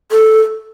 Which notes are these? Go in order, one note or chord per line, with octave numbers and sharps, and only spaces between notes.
A4